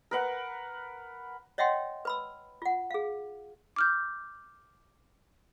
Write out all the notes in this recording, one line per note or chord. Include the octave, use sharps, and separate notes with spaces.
A#4 B4 F#5
C#5 D#5 E5 F#5 G5 C6
B4 B5 E6
F4 F#5
G#4 F5
D6 F6 G6